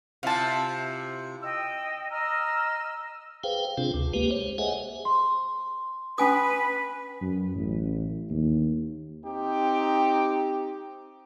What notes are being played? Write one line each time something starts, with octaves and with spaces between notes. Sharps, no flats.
C3 E4 F4 F5 A5
D#5 G5 E6
D#5 A#5 E6 F6
G#4 B4 C5 F5 G5
C3 C4 D4 F4 G#4
D2
G#3 A#3 G4 B4
C5 C#5
G#4 C5 D#5 E5 F#5 G#5
C6
C#4 B4 G#5 D#6
F#2
A1
D#2
C4 D#4 G4